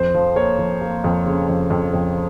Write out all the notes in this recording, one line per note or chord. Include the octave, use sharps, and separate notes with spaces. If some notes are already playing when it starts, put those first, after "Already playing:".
Already playing: F2 C5
F3
A#3 C#5
F3
A#3
F2
C#3
F2
F2
F2